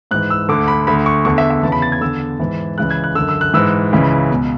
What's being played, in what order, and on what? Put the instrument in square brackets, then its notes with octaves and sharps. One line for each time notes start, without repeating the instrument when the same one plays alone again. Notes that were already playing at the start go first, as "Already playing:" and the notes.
[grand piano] G#2 F#6
E3
E6
D2 D3 D6
B5
D2 D3 B5
C#6
E2 D3 C#6
E5
E5
E2 C#3 E3 A5
B5
A6
G#6
E2 D3 E6
G#2 E3
C#2 C#3 E3 F#6
G#6
F#6
D3 E6
F#2
E6
F#6
G#2 E3 E6
C#2 C#3 E3
C#2 B2